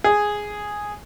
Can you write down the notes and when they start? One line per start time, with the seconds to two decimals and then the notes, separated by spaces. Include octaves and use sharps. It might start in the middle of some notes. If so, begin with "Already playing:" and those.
0.04 G#4